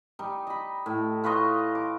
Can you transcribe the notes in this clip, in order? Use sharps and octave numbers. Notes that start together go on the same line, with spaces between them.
G3 D#4
D#5 B5
A2
F4 B4 C#5 D#5
D6